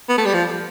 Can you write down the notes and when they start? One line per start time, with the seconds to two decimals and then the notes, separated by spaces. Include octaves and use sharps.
0.09 B3
0.18 A3
0.26 G3
0.34 F3